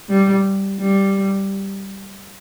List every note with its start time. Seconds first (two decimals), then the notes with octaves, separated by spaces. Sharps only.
0.09 G3
0.80 G3